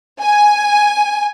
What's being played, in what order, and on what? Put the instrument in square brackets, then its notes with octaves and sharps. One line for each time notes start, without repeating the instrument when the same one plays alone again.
[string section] G#5